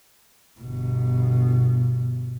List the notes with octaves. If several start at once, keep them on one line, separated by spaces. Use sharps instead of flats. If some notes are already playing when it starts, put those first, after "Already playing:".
G1 B2